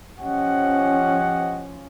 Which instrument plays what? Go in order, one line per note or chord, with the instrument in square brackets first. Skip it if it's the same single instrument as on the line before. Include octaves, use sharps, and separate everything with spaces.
[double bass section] F3 C#4 [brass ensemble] G4 D#5 F#5